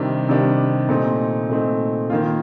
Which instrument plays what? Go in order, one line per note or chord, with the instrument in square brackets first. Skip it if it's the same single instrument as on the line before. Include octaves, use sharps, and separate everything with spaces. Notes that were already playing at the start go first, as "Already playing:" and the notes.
Already playing: [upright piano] C3 D#3 G3 D4
C3 D#3 G3 D4
A#2 A3 C4 D#4
A#2 A3 C4 D#4
D#3 A#3 F4